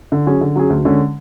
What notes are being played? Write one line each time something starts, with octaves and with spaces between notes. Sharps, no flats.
D3
F#3 C#4 G#4
D3
F#3 C#4 G#4
D2
D3 G#3 C#4